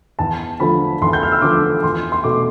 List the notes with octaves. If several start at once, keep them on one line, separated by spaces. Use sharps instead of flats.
E2 A5
D3 F3 A3 B5
E2 C6
G6
F6
E6
D3 F3 A3 D6
E2 C6
C6
B2 A3 D6